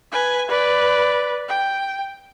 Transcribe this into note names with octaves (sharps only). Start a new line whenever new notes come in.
B4 G#5
B4 D5
G5